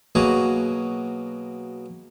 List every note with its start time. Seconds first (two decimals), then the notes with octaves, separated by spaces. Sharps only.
0.15 B2 F#3 A#3 F#4 G#4